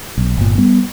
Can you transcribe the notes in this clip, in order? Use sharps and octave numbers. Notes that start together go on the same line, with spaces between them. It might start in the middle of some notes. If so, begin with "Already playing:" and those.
B1
G1 A#2
G3 B3